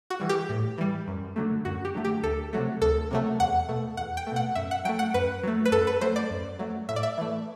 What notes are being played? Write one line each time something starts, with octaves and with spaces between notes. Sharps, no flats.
F#4
E3 G3
G4
A2
E3 G3
F#2
D3 F#3 A3
F#2 F#4
G4
D3 F#3 A3
G4
D2 A4
C3 F#3 A3
D2 A4
C3 F#3 A3
E2 F#5
B2 A3
E2 F#5
G5
A3
B2 F#5
F#2 E5
F#5
F#3 A3 G5
F#5
F#2 B4
F#3 A3
B4
F#2 A4
B4
F#3 A3 C5
D5
F#2
F#3 A3
A2 E5
D5
E5
E3 A3